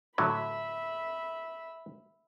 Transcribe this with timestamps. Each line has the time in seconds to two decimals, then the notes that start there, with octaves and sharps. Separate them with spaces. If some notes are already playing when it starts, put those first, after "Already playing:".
0.18 A2 D3 F#3 E5 B5